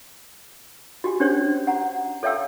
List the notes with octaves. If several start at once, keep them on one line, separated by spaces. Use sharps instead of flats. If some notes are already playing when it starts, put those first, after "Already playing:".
F#4 G4 G#5
C#4 D4 G4 C5 C#5
F#5 A#5
A4 C#5 E5 F5 G5 E6